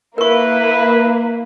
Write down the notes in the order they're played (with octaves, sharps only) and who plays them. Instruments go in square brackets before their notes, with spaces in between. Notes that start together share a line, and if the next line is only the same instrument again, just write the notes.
[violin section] A#3 [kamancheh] E4 [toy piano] A#4 C#6 [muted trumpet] B4